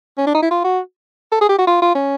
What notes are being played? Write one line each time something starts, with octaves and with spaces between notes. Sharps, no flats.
C#4
D4
D#4
E4
F4
F#4
A4
G#4
G4
F#4
F4
F4
C#4